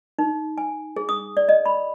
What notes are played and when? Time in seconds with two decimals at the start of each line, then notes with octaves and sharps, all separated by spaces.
0.19 D#4
0.58 G#5
0.96 G#4
1.09 D#6
1.37 D5
1.49 D#5
1.66 B5